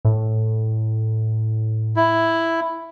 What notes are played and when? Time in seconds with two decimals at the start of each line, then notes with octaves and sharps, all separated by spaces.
0.05 A2
1.96 E4